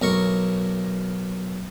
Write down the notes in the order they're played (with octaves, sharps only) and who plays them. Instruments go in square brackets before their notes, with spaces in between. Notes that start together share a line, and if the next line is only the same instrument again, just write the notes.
[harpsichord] B1 A#4 C#6